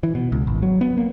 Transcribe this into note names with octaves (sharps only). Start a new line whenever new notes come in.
E3
B2
C#2
G#1
F#3
B3
A#3